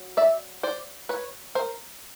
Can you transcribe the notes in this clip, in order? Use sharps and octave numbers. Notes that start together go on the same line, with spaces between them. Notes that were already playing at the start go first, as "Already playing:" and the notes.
Already playing: F#3
D5 E5
C5 D5
B4 C#5
A#4 C5